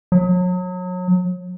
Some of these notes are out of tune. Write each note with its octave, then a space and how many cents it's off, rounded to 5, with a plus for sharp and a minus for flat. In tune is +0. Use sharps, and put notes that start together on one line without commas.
F#3 -30